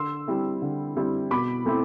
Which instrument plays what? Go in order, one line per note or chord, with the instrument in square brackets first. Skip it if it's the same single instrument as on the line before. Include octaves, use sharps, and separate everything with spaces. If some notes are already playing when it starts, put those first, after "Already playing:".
Already playing: [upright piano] D3 C6 E6
G3 C4 E4
D3
G3 C4 E4
B2 B5 D6
A3 C4 E4